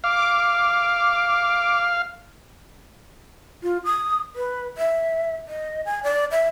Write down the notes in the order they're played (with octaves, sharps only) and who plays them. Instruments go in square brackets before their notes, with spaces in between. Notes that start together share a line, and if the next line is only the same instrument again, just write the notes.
[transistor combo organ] F5 [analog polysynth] D6
[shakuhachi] F4
D#6
B4
E5
D#5
G#5
D5
E5